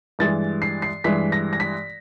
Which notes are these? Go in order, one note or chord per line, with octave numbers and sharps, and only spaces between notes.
G2 E3 G#3 A6
C7
C7
G2 E3 G#3 B6
A#6
A#6
B6